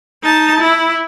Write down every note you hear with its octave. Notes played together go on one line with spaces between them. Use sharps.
D#4 A5
E4